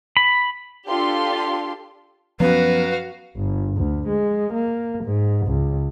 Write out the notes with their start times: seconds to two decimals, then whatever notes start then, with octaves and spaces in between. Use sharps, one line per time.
0.17 B5
0.87 D4 F4 G4 A4 C6
2.40 F#2 F3 B3 F#4 B4 F5
3.37 G1
3.77 D2
4.09 G#3
4.54 A#3
5.04 G#2
5.47 C#2